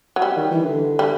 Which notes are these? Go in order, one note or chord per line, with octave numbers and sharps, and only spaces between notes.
F#3
G3
D#3
E3
D3
G3